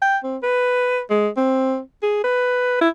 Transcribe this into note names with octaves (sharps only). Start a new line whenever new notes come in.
G5
C4
B4
G#3
C4
G#4
B4
E4